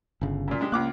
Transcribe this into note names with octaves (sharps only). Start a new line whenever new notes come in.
G1 C#3
F#2 A#2
G#3 D4 G4
C#2 A#3 D6 F#6